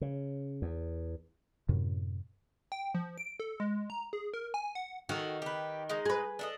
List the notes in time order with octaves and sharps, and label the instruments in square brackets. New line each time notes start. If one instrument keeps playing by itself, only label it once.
[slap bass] C#3
E2
[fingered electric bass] F#2 A2 C3
[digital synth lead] G5
F3
D7
A4
G#3
A#5
G#4
A#4
G#5
F#5
[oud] D#3 [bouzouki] F#4 A4
[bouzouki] G4 B4
G#3 D#4
[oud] G#4 B4
[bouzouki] D4 A4 D#5